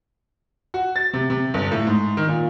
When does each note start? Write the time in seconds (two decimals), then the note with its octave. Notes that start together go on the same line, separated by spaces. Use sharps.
0.74 F#4
0.96 A6
1.13 C3
1.30 C3
1.54 G1
1.72 A2
1.87 G#2
2.17 D#3
2.28 A#2